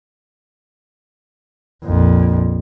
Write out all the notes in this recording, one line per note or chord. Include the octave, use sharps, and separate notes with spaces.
A#1 F2